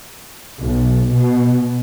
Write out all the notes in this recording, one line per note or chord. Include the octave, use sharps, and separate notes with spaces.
B1
B2